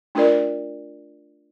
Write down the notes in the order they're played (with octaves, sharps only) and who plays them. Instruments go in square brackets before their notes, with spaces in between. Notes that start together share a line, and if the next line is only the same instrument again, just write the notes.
[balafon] A3 D4 F4 A#4 D5